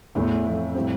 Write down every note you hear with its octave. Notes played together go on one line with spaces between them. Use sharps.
E2 A2 E3 A3
F2
A2 G3 C4